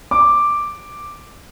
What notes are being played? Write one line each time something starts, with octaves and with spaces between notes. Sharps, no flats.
D6